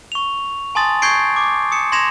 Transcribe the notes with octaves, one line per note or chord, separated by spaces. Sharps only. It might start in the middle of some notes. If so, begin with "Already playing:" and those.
C#6 F7
G#5 A5 C6 D#6 A6
C#6 G6 G#6 C7 D7
D6
D#6 C#7 E7
C6 G#6 A#6 E7 F7